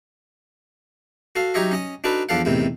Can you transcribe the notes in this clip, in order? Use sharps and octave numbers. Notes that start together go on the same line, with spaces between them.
F#4 A4 F5
F#3 D#4 G4 C#5 D#5 E5
C#4 D#5 D#6
D4 D#4 F#4 A4 B4
E2 F3 D4 A4 F5 F#5
E2 A2 C3 D#3